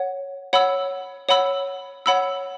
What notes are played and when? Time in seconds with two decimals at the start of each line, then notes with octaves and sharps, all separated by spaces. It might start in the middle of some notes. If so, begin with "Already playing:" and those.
Already playing: C#5 F#5
0.53 C#5 F#5 B5 E6
1.29 C#5 F#5 B5 E6
2.06 C#5 F#5 B5 E6